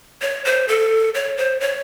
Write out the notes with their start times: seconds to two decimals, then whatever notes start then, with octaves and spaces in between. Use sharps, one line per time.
0.22 C#5
0.45 C5
0.68 A4
1.15 C#5
1.37 C5
1.60 C#5